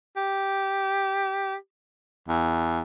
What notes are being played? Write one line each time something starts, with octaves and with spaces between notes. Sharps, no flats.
G4
E2